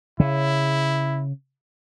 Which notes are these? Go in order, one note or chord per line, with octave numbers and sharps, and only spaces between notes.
C#3 E4